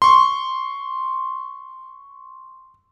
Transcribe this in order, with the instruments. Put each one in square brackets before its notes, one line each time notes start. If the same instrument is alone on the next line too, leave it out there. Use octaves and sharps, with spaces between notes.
[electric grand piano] C6 C#6